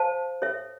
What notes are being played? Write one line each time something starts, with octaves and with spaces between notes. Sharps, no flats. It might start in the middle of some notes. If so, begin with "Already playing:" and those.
Already playing: C5 F5 A5
A4 C#5 E5